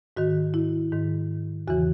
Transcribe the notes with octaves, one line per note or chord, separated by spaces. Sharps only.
G#2 D#3 F#4
E4
G#2 D#3
E2 C#3 E3 F#4